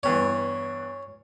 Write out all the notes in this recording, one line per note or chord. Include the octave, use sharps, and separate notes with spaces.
E2 G2 E3 C#5